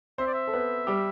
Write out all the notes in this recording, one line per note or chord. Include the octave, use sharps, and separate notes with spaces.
C4 C5 E5
D5
E5
A4
B3 B4
G3 G4